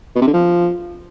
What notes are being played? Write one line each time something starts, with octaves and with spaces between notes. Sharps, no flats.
B2
C3
D3
F3